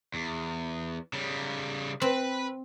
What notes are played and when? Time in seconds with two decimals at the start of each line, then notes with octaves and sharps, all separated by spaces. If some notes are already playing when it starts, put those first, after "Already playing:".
0.14 E2
1.13 C#3 G3
2.01 C4 B4 B5